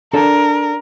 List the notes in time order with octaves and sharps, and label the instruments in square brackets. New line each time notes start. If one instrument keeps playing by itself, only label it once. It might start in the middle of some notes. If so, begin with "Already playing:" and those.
[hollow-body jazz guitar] D4 A4 [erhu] A#4